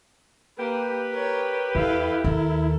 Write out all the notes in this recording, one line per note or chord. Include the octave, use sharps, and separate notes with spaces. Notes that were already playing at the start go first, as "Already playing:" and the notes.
A#3 G4 B4
A#4 C#5
E2 E4 A4 F5
D#2 A4 A#4